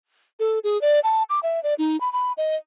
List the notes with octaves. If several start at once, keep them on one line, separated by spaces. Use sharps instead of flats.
A4
G#4
D5
A5
D6
E5
D5
D#4
B5
B5
D#5